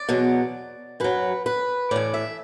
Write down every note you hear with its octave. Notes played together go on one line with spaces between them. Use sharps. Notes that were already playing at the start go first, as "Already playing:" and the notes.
Already playing: D5
E2 B2 F#3
F#2 F#3 B4
B4
A2 E3 D5
E5